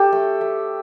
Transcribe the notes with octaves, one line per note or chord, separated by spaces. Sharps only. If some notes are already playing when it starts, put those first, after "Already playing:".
Already playing: G4 A4
A3
A3